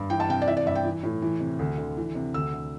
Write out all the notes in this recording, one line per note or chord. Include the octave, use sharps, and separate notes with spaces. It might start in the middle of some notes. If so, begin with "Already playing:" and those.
Already playing: G2
E3 G5
A5
C3 G5
D5
E3 E5
D5
G2 E5
G5
E3
A2
E3
C3
D2
D3
E3
C3
D2 E6
D3